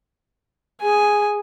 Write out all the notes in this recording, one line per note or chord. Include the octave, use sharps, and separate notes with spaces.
G#4 G#5